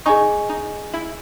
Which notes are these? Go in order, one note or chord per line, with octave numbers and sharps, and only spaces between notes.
D#4 G#4 D#5 G#5 C#6
D#4
E4